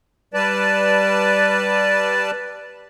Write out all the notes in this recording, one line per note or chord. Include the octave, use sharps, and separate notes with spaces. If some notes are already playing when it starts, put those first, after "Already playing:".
G3 B4 D5 A5